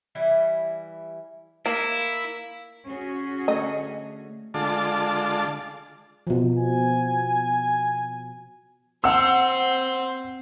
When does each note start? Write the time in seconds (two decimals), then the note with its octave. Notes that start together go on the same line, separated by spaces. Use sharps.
0.15 E3 G3 E4
1.66 A#3 E4
2.87 C#4 F#4 G#4
3.48 D3 A3 D#5
4.54 D3 G#3 F4 A5 D6
6.27 B2 F3
6.58 G#5
9.04 C4 C5 F#5 E6